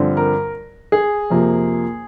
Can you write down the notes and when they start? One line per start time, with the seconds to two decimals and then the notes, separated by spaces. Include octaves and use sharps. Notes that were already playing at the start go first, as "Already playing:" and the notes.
Already playing: G2 D3 F3 C4
0.17 A#4
0.92 G#4
1.30 F2 C3 F3 A#3